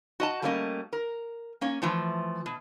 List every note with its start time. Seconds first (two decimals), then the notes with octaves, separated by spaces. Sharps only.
0.20 F#4 D#5 A5
0.42 G3 A3 A#3 C#4 D5 D#5
0.93 A#4
1.61 A#3 C#4 C#5
1.82 E3 F3 A3
2.46 B2